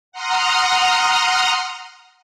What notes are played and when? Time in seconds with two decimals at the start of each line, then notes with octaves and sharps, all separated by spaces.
0.12 F#5 A#5 C6 D#6 F6